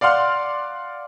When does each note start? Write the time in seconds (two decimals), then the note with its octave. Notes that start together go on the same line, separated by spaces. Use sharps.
0.01 D5 F5 F#5 C6 F6